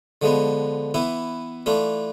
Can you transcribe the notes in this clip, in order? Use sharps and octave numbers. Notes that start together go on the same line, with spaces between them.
D3 F3 G#3 B3
E3 B3 E4
E3 A3 D4 F4